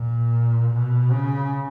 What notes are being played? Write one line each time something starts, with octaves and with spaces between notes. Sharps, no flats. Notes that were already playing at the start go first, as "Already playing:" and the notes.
Already playing: A#2
B2
C#3